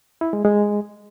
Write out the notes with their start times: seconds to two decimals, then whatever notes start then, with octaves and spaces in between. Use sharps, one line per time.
0.21 E4
0.33 G#3
0.45 G#3